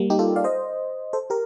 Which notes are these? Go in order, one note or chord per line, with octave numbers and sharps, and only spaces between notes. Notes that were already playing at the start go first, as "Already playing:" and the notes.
Already playing: G3 A#3
D#4 G4
F4 A4
D5 F5
C5 D#5
A4 C5
G4 A#4